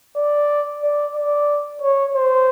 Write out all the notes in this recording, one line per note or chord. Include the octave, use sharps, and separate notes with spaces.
D5
D5
D5
C#5
C5